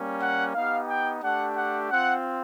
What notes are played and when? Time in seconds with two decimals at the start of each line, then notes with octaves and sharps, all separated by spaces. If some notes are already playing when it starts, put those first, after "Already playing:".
Already playing: G3 A#3 C#4
0.21 F#5
0.54 B3 D#4 G4 F5
0.89 G5
1.23 A3 D4 G4 F#5
1.57 F#5
1.90 C4 F4 F#5